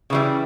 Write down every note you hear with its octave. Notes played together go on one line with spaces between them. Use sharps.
C#3 E3 G3